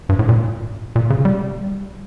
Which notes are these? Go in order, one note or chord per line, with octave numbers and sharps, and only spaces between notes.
G2
A2
A#2
A#2
C#3
G3